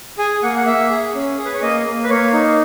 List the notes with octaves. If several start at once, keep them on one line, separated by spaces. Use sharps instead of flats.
G#4 G#5
A#3 F#5
F#5
A#3 E5
G#4
C#4
G#4
B4
C#5
A#3 D#5
A#3
B4
A#3 C#5
D#4